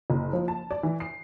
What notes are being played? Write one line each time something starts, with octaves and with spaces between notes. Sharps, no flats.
F#1
F3
A5
D5
E3
C7